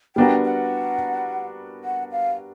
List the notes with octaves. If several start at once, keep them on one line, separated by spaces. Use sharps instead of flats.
G3 B3 D4 F#4 A#4 G5
F#5
F#5
F5